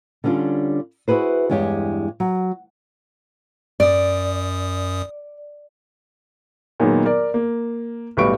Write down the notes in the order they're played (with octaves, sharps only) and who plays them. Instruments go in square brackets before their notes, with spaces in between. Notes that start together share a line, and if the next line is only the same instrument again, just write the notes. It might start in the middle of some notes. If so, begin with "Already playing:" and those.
[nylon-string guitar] D3 G3 C#4 D4 F4
E4 F#4 G#4 B4 C5
E2 G2 G#3 G4 C#5
F#3
[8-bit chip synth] F#2 D#6 [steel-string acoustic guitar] D5
[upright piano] A#2 D#3 F#3 G#3 B3
A#4 D5
A#3
B1 A2 G3 B4 C#6 D7